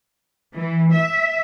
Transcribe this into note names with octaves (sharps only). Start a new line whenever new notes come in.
E3
E5